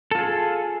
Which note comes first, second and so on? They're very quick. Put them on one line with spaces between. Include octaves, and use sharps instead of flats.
A4 F4 G#4